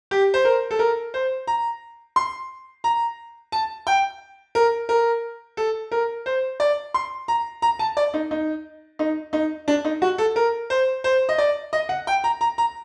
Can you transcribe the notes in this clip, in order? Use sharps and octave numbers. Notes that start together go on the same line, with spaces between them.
G4
C5
A#4
A4
A#4
C5
A#5
C6
A#5
A5
G5
A#4
A#4
A4
A#4
C5
D5
C6
A#5
A#5
A5
D5
D#4
D#4
D#4
D#4
D4
D#4
F#4
A4
A#4
C5
C5
D#5
D5
D#5
F#5
G5
A#5
A#5
A#5